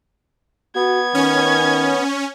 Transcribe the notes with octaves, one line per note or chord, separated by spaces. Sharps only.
B3 F#4 G#6
D#3 C#4